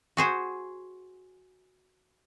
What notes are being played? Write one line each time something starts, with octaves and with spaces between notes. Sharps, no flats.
F#4 G#4 C5